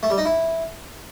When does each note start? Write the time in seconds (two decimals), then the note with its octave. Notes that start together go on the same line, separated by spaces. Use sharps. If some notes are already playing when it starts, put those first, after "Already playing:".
0.03 A3
0.10 G3
0.18 D#4
0.25 E4